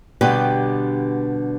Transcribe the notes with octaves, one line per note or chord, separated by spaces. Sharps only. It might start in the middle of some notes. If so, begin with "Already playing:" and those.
B2 D3 G3 B3 D4 G4